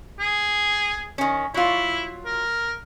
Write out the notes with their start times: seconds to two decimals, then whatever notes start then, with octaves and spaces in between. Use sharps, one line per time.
0.19 G#4
1.18 D#3 C#4
1.54 F#3 E4 F4
2.25 A#4